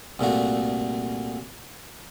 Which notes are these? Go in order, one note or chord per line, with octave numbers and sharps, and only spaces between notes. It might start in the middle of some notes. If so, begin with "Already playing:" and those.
C2 A#2 A3 F#4